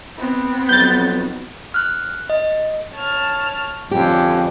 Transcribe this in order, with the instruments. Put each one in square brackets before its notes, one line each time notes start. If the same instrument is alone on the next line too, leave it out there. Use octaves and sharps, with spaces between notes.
[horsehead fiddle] B3 C4
[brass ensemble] B1 F2 F#3 [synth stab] G6 A6
[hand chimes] F6 F#6
D#5
[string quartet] C#5 A5 F6
[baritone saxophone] F2 [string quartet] D3 G#3 C#4 [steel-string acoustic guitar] G4